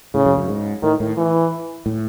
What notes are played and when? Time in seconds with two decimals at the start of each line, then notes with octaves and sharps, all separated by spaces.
0.14 A2 C#3
0.25 F#2
0.38 F#2
0.48 G#2
0.82 A2 D#3
1.00 A2
1.17 E3
1.86 A2